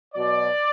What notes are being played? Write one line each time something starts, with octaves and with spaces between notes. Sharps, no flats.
B2 F#3 D5